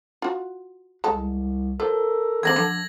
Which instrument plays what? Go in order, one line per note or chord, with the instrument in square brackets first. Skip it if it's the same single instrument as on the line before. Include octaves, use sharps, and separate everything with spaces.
[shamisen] F4 F#4
[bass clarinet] C2 [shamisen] G#3 A4
[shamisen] F3 [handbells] A4 [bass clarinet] A#4
[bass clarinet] E3 [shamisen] A#3 C4 G#4 [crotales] G#6 A#6 F#7
[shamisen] D3 [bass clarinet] F3